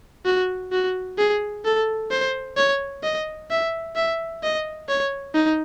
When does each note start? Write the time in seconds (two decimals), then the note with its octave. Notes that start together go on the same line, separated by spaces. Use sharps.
0.25 F#4
0.72 F#4
1.18 G#4
1.65 A4
2.10 C5
2.57 C#5
3.03 D#5
3.50 E5
3.96 E5
4.43 D#5
4.88 C#5
5.34 D#4